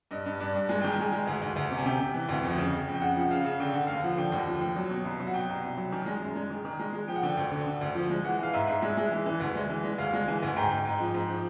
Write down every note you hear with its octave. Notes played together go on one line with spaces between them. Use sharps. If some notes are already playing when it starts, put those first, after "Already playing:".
G2 D#5
G2
G2 D5
G2
G#3 G#5
D#3 G5
G#5
G#3
G#3
D2
D2
D2
C3
G#5
C3 G5
C3
E3
D2
F2
C#3
C#3
F2
G5
C#3 F#5
F3 F#5
C#3 F5
C#3
D3 G5
D3 F#5
D#2 F5
F3 F#5
D3 G5
D#2
F3
D#2
F#3
B2
C2
F#3
F#5
B2 G5
C2
C2
F#3
D#3 G#5
G#3
F#2
G#3
D#3
D#3
G#3
G#3
F3 G5
F#5
D3 G5
D2
D3
D3
D2
F3
G#3
E3 F#5
E3 F5
G#2 E5
G#2
G#3 E5
G#3
E3
E3
D2
G#3
E3
G#3
D2 F5
G#3
E3 G#5
D2 G#5
G#2 G5
G#2
G#2
F3
G#2
F3